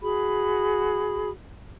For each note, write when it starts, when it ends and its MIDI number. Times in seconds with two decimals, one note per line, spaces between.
0.02 1.30 66
0.02 1.30 68
0.02 1.30 83